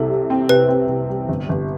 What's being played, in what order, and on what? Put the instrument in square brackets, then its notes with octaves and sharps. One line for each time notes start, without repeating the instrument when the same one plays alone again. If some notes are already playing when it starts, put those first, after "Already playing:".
Already playing: [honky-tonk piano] C2 C3 [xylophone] A4
[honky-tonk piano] G3
C4
[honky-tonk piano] C3 [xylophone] B4
[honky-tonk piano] C4
C3
G3
G1
G1